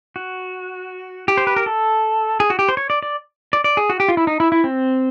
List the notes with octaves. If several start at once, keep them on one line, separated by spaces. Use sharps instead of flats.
F#4
G4
C5
B4
A#4
A4
G#4
F#4
G4
C5
C#5
D5
D5
D5
D5
G#4
F#4
G4
F4
E4
D#4
E4
E4
C4